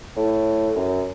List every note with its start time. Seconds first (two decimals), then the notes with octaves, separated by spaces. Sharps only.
0.17 A2
0.75 F#2